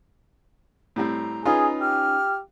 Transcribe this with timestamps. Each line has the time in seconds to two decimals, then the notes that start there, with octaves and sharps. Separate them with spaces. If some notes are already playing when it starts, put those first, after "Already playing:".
0.96 A2 G3 C4 A#5
1.46 C#4 D#4 F4 G#4 B4
1.80 G4 F6